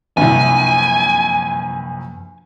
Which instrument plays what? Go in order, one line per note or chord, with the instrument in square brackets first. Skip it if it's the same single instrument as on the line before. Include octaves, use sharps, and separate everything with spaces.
[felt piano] G1 C2 [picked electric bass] F#2 F3 A#3 [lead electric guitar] G#5